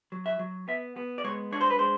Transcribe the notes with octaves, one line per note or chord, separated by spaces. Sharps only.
F#3
E5
F#3
B3 E5
B3
D5
G#3 C#5
D4 C#5
C5
B4
G#3 C5